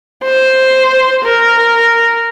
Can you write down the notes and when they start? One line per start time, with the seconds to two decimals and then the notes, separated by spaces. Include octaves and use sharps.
0.24 C5
1.24 A#4